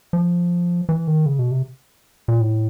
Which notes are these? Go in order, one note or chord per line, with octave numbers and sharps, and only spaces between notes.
F3
E3
D#3
C#3
B2
C3
A#2
A2